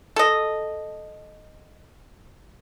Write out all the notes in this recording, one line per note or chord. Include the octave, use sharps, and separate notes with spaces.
A4 D#5